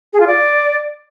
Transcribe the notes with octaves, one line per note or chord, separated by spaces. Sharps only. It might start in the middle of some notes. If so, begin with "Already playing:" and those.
G#4
F4
D5